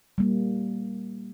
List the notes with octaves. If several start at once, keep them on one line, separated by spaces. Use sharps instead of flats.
G3 A#3